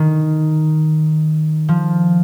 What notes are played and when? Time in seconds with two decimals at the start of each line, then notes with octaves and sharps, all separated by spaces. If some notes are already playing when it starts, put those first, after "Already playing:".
Already playing: D#3
1.69 F3